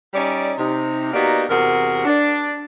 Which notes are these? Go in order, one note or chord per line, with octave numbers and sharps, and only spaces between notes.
G3 C#4 D#4 D5
C3 D#4
A#3 B3 D#4 F#4 G4 D5
E2 C3 F#4 G#4 A#4
D4